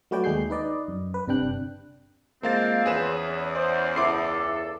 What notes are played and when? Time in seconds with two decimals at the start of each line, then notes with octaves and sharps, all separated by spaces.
0.11 F#3 A3 F#4 B4 D5 G5
0.24 D#2 G#3 G#4 G6 C7
0.50 D#4 B4 D5 D#5
0.88 F#2
1.14 B4
1.28 G1 C3 D4 G5 F#6
2.43 F3 G#3 A#3 C4 F5 A6
2.86 E2 C#4 G#4 B4 E7
3.55 C5 D5
3.96 C#2 E4 A4 D6 C7